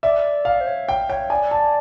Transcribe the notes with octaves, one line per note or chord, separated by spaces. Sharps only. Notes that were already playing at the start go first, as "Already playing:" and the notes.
D5 E5
F5
C5
C#5
G5
C#5 G5
D5 G#5
A5